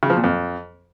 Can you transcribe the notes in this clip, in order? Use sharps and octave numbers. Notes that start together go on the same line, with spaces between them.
C#3
F3
A#2
F2